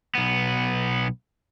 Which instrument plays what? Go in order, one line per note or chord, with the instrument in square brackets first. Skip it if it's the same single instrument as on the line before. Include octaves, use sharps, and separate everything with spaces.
[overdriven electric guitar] B1 B3